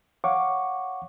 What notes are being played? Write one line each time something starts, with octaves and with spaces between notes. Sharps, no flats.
C#5 F5 F#5 C#6 D6